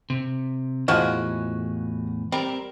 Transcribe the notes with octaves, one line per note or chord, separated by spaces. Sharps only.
C3
E2 A2 E3 F3 G#3 F#4
G3 C4 A#4